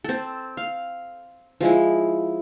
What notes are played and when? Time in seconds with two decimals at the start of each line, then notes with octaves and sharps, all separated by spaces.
0.04 C4 A4
0.57 F5
1.61 F3 G#3 E4